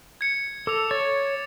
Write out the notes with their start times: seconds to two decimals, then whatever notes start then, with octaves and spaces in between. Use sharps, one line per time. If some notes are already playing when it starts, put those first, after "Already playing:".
0.21 G#6 C#7
0.67 A4 D6 F7
0.91 C#5 C#6 A6